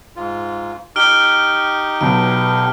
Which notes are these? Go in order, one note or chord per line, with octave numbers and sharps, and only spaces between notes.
G#2 F4
D#4 G4 F6 D7 G7
B1 B2 D7